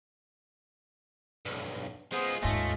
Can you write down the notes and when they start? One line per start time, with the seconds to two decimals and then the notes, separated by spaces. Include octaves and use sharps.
1.45 B1 G2
2.12 G#3 B3 F4 G#4 C5
2.42 D#2 G#2 A3 C#4 F4 D#5